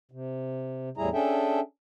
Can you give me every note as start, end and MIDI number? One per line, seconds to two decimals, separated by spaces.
0.11 0.89 48
0.97 1.09 40
0.97 1.09 45
0.97 1.09 55
0.97 1.09 64
0.97 1.09 68
0.97 1.09 82
1.13 1.60 61
1.13 1.60 62
1.13 1.60 68
1.13 1.60 69
1.13 1.60 76
1.13 1.60 79